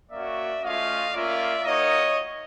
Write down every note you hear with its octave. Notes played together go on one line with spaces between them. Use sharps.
A#3 C#4 F#4 D5 E5
A3 C#4 F4 D#5 F5
A#3 C#4 F4 D5 E5
A#3 D#4 F#4 C#5 D#5